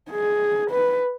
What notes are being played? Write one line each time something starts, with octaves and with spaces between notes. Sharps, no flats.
G#4
B4